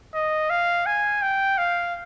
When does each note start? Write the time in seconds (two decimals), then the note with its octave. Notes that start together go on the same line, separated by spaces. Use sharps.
0.15 D#5
0.50 F5
0.86 G#5
1.22 G5
1.58 F5